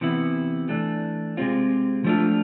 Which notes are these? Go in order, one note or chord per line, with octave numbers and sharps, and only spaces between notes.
C3 E3 B3 E4
E3 A3 D4
C3 G#3 C4 F4
F3 A3 D4 F4